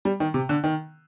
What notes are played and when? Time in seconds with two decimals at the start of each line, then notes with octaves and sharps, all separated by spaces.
0.05 G3
0.20 D#3
0.34 C3
0.49 D3
0.64 D#3